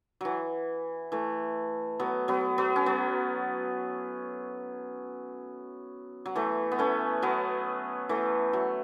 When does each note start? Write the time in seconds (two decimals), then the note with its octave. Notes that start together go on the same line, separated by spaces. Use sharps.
0.21 E3 F#3
1.12 E3 A3
2.00 F#3 B3
2.28 F#3 B3
2.58 F#3 B3
2.76 C#4
2.86 F#3 B3
6.26 F#3
6.35 E3 A3
6.72 B3
6.79 A3 C#4
7.22 F#3 B3
8.09 E3 A3
8.53 F#3